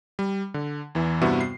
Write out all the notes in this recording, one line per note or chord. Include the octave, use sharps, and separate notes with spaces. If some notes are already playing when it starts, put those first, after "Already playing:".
G3
D3
E2 E3
G2 C3 G3 B3 E4 F#4
C7